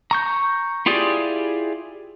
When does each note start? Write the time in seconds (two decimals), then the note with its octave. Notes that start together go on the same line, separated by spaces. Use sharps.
0.11 A#5 C#6 G6
0.86 E4 F4 G4 G#4 D5